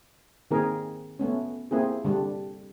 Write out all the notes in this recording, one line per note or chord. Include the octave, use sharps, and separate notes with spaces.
D#3 A#3 C4 G#4 A#4
A3 B3 C#4
A#3 C4 E4 G#4
D3 G3 D4